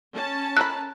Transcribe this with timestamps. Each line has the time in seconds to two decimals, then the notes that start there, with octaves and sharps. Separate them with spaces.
0.14 C#4 A5
0.57 A4 A#4 B5 F#6